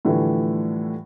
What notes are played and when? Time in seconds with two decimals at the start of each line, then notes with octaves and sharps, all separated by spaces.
0.05 A2 D3 E3 F3 G3 A3